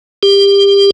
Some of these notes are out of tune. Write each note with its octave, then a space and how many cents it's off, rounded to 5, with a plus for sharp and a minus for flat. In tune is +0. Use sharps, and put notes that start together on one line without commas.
G4 +25